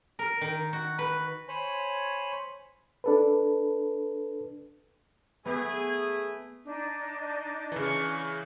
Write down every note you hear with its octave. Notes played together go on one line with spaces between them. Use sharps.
A#4
D#3
F#4
B4
C5 C#5 G#5 B5
D4 A4 B4
A3 B3 G#4
D4 D#4
C#3 E3 C#6